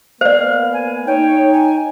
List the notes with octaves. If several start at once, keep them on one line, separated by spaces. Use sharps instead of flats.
A#3 B3 C5 D5 F5
G#5
D#4 C#5 G5
G#5